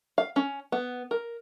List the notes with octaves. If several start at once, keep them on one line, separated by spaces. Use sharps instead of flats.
F5
C#4
B3
A#4